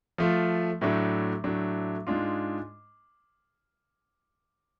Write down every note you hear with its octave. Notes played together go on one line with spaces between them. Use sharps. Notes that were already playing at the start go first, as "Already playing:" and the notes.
F3 A3 F4
A2 F#3 A3 D4
A2 F#3 A3 D4
G#2 G#3 D4 F4